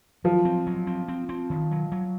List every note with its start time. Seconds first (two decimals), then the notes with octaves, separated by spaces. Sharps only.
0.24 F3 F#3
0.45 C4
0.67 F#3
0.87 C4
1.08 C4
1.29 C4
1.50 D#3
1.71 F#3
1.92 F#3